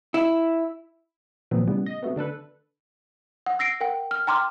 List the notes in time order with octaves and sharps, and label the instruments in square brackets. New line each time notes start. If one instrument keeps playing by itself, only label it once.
[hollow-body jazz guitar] E4
[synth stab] A#2 D#3 F3 F#3 B3 C4
A2 C#3 G3 B3
D#5
C3 F#3 A3 B3
D3 D4 A4 B4
[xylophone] F#5
E6 A#6 C7 D7
A#4 F#5 G5
F6
G5 A#5 C6 D6 F6